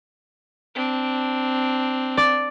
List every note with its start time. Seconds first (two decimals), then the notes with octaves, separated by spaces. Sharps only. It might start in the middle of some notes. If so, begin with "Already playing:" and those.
0.75 C4 D4
2.17 D5